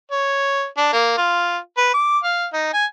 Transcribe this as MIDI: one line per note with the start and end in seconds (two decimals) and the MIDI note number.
0.11 0.66 73
0.77 0.92 62
0.93 1.15 58
1.18 1.58 65
1.77 1.90 71
1.94 2.18 86
2.24 2.47 77
2.53 2.69 63
2.73 2.85 80